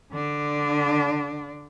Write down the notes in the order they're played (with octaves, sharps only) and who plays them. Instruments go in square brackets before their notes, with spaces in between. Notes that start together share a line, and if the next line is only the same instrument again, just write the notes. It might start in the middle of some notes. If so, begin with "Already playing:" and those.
[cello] D3 D4